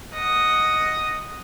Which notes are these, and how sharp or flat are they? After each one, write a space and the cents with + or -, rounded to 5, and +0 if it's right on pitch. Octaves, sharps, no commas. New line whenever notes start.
D#5 +0 F#5 +0